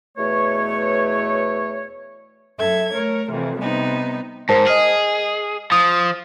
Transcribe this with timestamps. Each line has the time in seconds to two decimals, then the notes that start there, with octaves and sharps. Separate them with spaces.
0.18 E2 B2 A3 C#5
2.58 F#2 A4 E5 G#6
2.94 A3 A#4 C#5
3.32 F2 C3 E3
3.60 C3 G3 B3 D#4
4.49 G#2 A#4 C5 A5
4.67 G#4 D#5 D#6 F6
5.72 F3 D#6